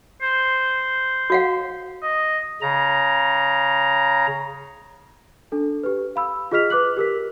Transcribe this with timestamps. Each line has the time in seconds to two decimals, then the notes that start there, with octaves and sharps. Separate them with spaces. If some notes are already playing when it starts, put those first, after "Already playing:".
0.22 C5
1.30 F#4 F5 F#5
2.02 D#5
2.62 C#3 A#5
5.52 D4 A4
5.83 G4 B4
6.16 F5 B5 E6
6.51 F4 G#4 D#5 F6 B6 F7
6.70 B4 D6 F#6 F#7
6.97 G4 A#4 B6